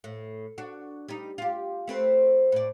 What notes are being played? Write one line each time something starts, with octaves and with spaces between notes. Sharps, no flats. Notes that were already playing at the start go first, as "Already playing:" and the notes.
A2
D4 F#4
G3 D#4
F4 G4
A3 C4 B4
A2 D5